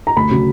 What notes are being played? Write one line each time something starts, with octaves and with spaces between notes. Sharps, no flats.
A#5
D2 B5
C#3 F#3